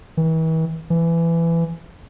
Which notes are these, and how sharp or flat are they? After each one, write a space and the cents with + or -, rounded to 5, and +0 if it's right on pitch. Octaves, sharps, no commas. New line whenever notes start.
E3 -40
E3 +20